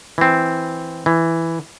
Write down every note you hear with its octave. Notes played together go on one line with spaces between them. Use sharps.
E3 C4
E3